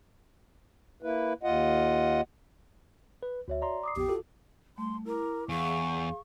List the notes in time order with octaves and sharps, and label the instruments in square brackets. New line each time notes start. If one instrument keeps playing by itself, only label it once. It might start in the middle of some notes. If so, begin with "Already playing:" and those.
[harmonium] A#3 E4 B4
D#2 F4 D#5 F#5
[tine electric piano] B4
[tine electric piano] D2 [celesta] F#4 C#5 E5
[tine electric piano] D5 A#5 C6
[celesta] D6 D#6 C7
[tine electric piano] A#1 F2 B3 [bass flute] G4
[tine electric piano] F4 F#4 A4
[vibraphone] G3 A3 [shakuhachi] C6
[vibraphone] E4 D6 [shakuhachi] A#4
[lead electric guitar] E2 [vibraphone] G#4 F5 [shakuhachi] C#6